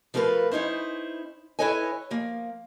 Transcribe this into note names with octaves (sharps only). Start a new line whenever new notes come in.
F3 A3 F4 A#4 B4
C#4 D#4 E4 C5
E4 A4 B4 C#5 D#5 G#5
F3 A#3